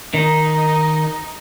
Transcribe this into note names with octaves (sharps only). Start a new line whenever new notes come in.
D#3 D#4